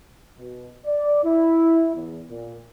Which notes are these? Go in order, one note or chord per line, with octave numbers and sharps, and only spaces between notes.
B2
D5
E4
E2
A#2